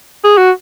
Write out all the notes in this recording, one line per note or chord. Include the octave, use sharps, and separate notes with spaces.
G#4
F#4